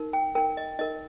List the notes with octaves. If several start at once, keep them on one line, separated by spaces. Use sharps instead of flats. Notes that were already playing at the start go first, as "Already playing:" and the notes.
Already playing: D#4 A#4
G5
D#4 A#4 G5
D#5
D#4 A#4 D#5